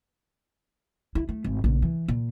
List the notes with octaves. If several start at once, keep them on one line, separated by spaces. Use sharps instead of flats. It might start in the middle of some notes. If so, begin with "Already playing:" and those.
E4
A3
G#1
A#1 C#3
E3
A#2